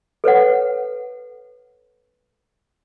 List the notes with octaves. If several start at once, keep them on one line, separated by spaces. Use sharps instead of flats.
A4 B4 C#5 F#5